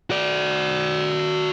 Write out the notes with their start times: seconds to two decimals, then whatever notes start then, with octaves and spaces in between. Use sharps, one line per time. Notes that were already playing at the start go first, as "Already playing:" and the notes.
0.10 F#4 D5